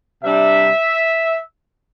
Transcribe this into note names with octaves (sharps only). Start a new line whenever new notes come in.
C3 G3 D4 E5